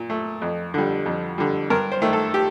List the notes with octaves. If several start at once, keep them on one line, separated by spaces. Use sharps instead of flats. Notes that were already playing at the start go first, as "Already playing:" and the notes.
Already playing: A#2
A3
F2
D3 G3
F2
D3 G3
G2 A#4
C5
D#3 A3
A4
G4